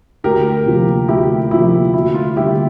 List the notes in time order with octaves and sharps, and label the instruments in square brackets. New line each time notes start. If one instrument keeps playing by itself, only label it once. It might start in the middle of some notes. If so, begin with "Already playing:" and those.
[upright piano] D2 [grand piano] G4 A#4
[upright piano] C3 F3 A#3
[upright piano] D2 [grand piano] E4 G4
[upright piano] C3 F3 A#3 [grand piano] E4
[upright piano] D2 [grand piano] E4
[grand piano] F4
[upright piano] D3 G3 A#3 [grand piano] E4 G4